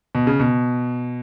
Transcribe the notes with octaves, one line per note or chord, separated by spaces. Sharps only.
B2
C#3
B2